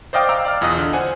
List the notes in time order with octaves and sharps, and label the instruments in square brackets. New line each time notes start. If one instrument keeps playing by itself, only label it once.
[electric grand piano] C5 D5 D#5 F5 G5 D6
F5 G5 A#5 E6 D7
D5 F5 F6
B1 E2 F4 D#5 D#6 F#6
D3
C5 F#5 G#5